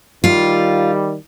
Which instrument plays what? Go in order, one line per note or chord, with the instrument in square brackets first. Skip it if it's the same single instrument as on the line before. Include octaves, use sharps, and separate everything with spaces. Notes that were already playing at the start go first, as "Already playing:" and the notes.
[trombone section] D#3 G3 [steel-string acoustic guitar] F4